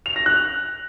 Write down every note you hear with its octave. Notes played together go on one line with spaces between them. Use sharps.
F7
A#6
F#6